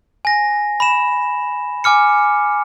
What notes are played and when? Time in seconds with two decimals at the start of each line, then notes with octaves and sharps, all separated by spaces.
0.25 G#5 A#6
0.80 B5 E7
1.84 G#5 D6 F6 C#7